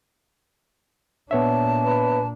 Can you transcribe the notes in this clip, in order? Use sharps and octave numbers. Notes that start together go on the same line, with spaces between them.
A#2 B3 D4 C#5 E5 A5
B4